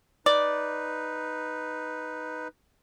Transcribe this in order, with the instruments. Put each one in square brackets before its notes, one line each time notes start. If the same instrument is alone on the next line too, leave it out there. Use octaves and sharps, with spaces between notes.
[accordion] D#4 B4 [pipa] D5